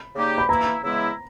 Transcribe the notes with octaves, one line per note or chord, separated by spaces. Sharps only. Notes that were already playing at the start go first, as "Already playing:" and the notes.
Already playing: B5
C#3 G3 A#3 D#4 G4
B5
E3 A#3 E4 A#5
C#3 E3 G#3 B3 E4